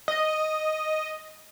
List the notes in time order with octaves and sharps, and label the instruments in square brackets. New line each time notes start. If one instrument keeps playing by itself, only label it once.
[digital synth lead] D#5